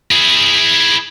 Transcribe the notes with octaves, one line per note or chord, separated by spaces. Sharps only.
E4 G#4